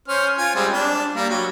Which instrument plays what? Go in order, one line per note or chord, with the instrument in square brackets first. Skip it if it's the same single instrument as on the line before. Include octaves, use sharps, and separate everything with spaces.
[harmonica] C#4 C5 F6
F4 G#5
G3 G#3 C4
D4
G3 A#3
F#3